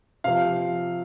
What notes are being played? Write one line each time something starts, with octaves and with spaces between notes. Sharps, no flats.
C3 F3 F5